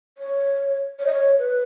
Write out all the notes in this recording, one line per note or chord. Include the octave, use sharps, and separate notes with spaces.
C#5
C#5
D#5
C#5
B4